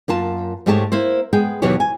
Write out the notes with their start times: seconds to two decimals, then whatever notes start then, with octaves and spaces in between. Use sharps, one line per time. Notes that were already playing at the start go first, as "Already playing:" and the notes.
0.08 F#2 A#3 F4 A5
0.66 G#2 G#3 A3 G4 C#5 A5
0.92 A#3 E4 C5
1.33 G#3 B3 G#4 G5
1.62 D#2 B2 E3 F#3 G4 C#5
1.80 G#5